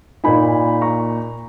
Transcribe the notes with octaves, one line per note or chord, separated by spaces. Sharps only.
A#2 A#3 D#4 G#5 B5
A#5 C#6